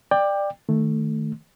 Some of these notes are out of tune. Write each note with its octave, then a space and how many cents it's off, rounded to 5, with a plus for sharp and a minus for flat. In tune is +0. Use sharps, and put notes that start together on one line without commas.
D5 +15 G5 +15
D#3 -5 A3 +0